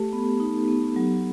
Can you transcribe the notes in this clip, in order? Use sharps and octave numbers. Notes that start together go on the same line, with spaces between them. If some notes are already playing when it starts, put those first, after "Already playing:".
Already playing: A3 G4 A4
B3
D#4
B3
F#3